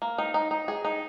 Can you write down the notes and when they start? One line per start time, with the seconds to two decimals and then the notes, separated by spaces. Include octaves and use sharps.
0.02 A#3
0.18 D#4
0.34 D#4
0.51 D#4
0.68 G#4
0.85 D#4